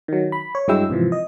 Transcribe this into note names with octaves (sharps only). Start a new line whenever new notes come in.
D#3 F#3
B5
C#5
G2 F#3 G#3 E4 G5 E6
G#2 C3 E3 F3
D#5